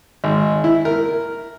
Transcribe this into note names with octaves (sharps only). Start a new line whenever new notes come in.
G#1
E4
A#4